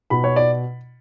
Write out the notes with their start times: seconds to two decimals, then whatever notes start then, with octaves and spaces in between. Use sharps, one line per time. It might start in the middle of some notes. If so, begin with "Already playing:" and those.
0.10 B2 B5
0.24 C#5
0.36 D5